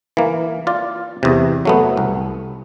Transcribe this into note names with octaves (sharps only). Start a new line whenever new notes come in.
E3 A#3
F4 D5
E2 C3
F#3 A3 B3
C2